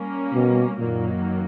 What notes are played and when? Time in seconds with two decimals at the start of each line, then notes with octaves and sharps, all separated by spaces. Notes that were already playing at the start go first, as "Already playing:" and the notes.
Already playing: G3 A#3 C#4
0.33 B2
0.79 F#2 A#2 D#3 F#3 A#3